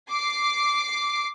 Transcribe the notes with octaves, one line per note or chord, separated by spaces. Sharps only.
D6 C7